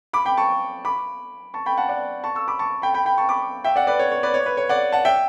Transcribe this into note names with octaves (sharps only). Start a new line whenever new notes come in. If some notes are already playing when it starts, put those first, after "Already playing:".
B5 D6
G5 B5
A5 C#6
B5 D6
A5 C#6
G5 B5
F#5 A5
D5 F#5
A5 C#6
C#6 E6
B5 D6
A5 C#6
G5 B5
G5 B5
G5 B5
A5 C#6
B5 D6
E5 G5
D5 F#5
B4 D5
C#5
C#5
B4 D5
C#5
B4
C#5
D5 F#5
F#5 A5
E5 G5